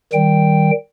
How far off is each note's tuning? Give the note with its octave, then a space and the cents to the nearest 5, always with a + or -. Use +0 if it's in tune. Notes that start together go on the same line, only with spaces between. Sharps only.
D#3 +0 G3 -15 G5 +0